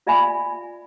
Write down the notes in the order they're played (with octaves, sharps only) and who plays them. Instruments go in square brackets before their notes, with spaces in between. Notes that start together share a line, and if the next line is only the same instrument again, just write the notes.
[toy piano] F4 D5 E5 F5 G#5 B5